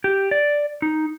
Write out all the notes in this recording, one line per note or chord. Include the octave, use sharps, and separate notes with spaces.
G4
D5
D#4